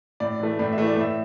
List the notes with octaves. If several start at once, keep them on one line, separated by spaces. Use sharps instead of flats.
A2 D5
E3 A3
A2 D5
E5
E3 A3
D5
A2 E5